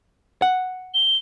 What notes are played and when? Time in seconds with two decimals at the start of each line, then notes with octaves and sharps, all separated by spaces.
0.42 F#5
0.94 G7